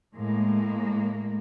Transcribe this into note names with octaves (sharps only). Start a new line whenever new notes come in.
A2 G#3 A#3